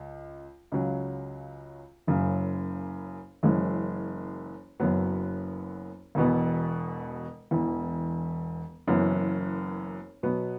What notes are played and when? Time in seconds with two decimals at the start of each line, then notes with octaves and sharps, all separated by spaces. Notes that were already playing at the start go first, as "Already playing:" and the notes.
Already playing: C#2
0.72 C#2 C#3 F#3
2.07 F#1 F#2 C#3
3.43 F#1 F#2 E3 G#3
4.80 F#1 F#2 F#3 B3
6.15 E1 E2 B2 B3
7.51 E1 E2 E3
8.87 F#1 F#2 E3 B3
10.23 B2 F#3 B3